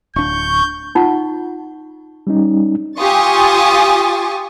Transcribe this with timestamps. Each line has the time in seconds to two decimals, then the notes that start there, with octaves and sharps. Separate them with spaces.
0.16 D1 D4 C#6 G6
0.95 D#4 F4 F#5
2.27 G3 C#4 D#4
2.98 F4 G4 G#5 C#6 D#6 A6